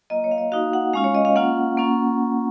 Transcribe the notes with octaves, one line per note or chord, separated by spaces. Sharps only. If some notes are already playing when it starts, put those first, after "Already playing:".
F#3 A#3 F4 D#5
C#5
F5
D#5
A#3 D#4 F#4 F5
F#5
G#3 C#4 F4 F5
C#5
D#5
F5
A#3 C#4 F4 F#5
A#3 C#4 F4